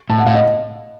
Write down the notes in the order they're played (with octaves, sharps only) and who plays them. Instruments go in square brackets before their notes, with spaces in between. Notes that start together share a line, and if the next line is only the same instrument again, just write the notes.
[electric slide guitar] A2 [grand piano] A5
[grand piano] F#5
[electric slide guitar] A2 [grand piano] F5
[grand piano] D#5